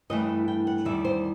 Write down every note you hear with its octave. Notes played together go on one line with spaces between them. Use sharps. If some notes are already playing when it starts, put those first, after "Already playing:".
G2 E3 A3 D#5
G5
F#5
E2 D#3 G3 E5
C5